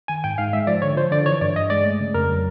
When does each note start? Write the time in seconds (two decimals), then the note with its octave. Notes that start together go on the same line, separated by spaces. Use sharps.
0.08 D#3 G#5
0.24 G#2 G5
0.38 G#2 F5
0.53 G#3 E5
0.67 F3 D5
0.82 D3 C#5
0.96 F3 C5
1.11 D3 D5
1.26 E3 C#5
1.41 G2 D5
1.56 G2 D#5
1.70 G#3 D5
1.85 A3
2.00 C#3
2.14 F2 A#4
2.30 F#3